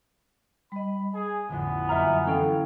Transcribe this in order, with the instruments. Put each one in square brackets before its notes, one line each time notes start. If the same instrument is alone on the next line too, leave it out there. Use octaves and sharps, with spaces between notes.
[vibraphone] G3 D#5 [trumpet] B5
[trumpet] G#4 [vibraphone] G#5
[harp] A1 F2 D3 [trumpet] B3
[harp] F#2 A#3 F6 [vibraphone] D#5 G#5 [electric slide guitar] E5 A#5
[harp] E3 [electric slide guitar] C#4 F5 G5 [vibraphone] A4